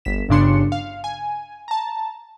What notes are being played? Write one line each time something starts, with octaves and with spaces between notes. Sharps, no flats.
G1 B6 E7
G1 G2 C#3 D4 C6 C#7
F5
G#5
A5 A#5